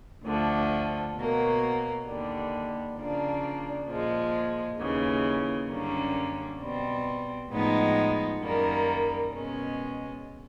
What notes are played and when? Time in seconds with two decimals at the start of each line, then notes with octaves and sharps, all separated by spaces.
0.24 D2 D3 F3 A3
1.16 B2 F#3 A#3
2.06 D#2 D3 G3
2.97 C#3 F3 A#3 D4
3.87 A#2 F3 G#3
4.79 D#2 C#3 E3
5.70 F#2 D3 G3 A#3 C#4
6.60 B2 G3 C4
7.51 A2 F3 G#3 B3 D#4
8.42 F#2 D#3 G3 A#3
9.33 B2 G#3 C#4